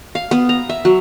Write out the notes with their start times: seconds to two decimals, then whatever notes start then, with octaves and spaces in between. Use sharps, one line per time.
0.15 F5
0.31 B3
0.49 A#5
0.69 E5
0.85 F#3